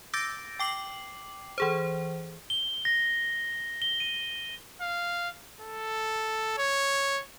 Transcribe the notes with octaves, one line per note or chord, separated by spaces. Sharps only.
D6 E6 G6 A6 A#6 D7
G5 D6 C7 F#7
E3 G#4 C5
G7
A#6
G7
D#7
F5
A4
C#5